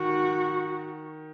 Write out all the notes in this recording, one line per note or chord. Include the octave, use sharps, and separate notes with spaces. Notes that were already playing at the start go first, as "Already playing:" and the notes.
Already playing: D#3 F#4